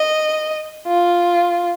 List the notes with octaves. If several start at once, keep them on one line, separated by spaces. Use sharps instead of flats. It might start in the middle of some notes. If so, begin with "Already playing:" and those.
Already playing: D#5
F4